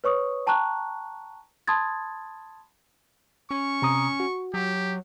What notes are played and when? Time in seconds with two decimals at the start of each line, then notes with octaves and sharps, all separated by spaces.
0.04 B4 C#5 C#6 D#6
0.47 G5 A5 A#5 C#6 F#6
1.67 A5 B5 C6 D#6 G#6 A6
3.51 C#4 C#6
3.82 C3 A#5 D#6
4.20 F#4
4.54 F#3 G4